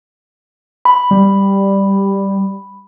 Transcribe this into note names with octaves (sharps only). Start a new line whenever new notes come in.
B5
G3